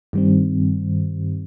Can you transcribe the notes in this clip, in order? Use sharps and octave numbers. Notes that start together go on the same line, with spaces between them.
G2 D#3 G3 C4